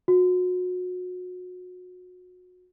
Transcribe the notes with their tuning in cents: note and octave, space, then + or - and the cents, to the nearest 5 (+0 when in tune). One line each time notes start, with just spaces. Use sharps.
F#4 -30